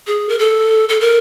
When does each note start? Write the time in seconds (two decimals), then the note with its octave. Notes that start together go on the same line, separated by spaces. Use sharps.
0.07 G#4
0.29 A#4
0.39 A4
0.89 A4
1.01 A#4